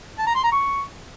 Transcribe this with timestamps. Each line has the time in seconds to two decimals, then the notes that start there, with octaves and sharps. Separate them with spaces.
0.18 A5
0.27 A#5
0.35 C6
0.44 A#5
0.52 C#6